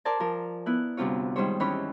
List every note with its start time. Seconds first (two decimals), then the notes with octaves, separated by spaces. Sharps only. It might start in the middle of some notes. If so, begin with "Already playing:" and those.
0.05 A#4 C5 D5 G#5 A5
0.20 F3 A#4
0.66 B3 E4 F#6
0.97 D2 G2 C3 F4 C#5
1.36 G#2 D#3 G3 C5 C#5
1.60 D#2 E3 C#4 C#5 B5 C#6